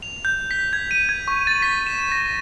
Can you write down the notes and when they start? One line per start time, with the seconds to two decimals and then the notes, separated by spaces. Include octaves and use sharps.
0.02 F7
0.25 G6
0.51 B6
0.73 G#6
0.91 D#7
1.09 G#6
1.28 C#6
1.47 A6
1.62 B6
1.87 E7
2.12 A#6